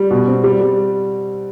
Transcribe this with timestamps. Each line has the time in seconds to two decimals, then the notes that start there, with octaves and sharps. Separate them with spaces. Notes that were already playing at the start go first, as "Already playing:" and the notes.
Already playing: G3
0.10 B2
0.27 C4
0.44 G3
0.61 G3